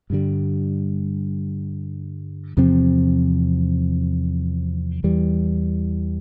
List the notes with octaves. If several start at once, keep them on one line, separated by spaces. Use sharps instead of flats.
G2 D3 G3
E2 C3 F3 C4
E2 E3 G3